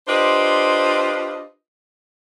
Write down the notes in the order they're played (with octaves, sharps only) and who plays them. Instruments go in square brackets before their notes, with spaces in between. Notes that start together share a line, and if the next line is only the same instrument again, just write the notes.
[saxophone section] D4 F4 G4 B4 C5 D#5